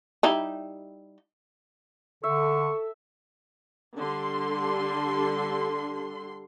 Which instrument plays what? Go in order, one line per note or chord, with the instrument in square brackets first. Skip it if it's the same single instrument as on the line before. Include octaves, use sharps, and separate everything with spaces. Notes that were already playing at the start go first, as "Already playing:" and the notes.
[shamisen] G3 D#4 E4
[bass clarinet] D3 [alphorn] A4 [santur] E5 [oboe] C#6
[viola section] D3 G3 C6